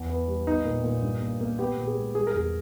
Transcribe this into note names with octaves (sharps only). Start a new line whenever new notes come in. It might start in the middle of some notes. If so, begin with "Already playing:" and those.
Already playing: E2
B3
G3
B3 D#4
A#2
A#2
G2
A#3
A#3
B3 G4
A#2
G#4
G#3
G3 G#4
A#4
E2 G#4